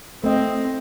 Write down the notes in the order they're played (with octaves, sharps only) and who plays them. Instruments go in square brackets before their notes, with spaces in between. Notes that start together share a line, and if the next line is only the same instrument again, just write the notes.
[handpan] A3 D#5 [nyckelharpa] C4